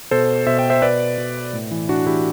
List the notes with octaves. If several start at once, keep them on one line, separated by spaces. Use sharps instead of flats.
B2 A4 C5
B2 C5 E5
E5 G5
C5 E5
B2 B4 D5
B2
A2
E3
A2 D4 F#4
E3 E4 G4